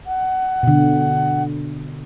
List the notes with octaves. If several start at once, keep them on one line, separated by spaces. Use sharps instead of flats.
F#5
B2 D3